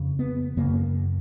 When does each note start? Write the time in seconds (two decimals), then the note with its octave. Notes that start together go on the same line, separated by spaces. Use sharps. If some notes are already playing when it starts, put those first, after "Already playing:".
Already playing: F2 C#3
0.19 B3
0.57 F#2 C#3 A#3